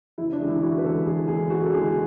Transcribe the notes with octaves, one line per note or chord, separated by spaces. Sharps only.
F#1 E4
D4
E2 D3 G#3
E4
F#1 F#4
B4
E2 D3 G#3 A4
F#1 G#4
E2 D3 G#3 G#4
F#1 F#4
A4
E2 D3 G#3 G#4